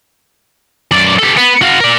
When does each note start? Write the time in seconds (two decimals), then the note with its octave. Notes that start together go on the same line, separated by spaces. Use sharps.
0.91 F#2 D5
1.19 G4 A4
1.37 B3
1.61 F#4 F5
1.80 A#4 D5